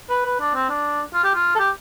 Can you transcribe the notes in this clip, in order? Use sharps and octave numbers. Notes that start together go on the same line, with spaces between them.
B4
B4
D4
C4
D4
F4
G4
F4
A4
G4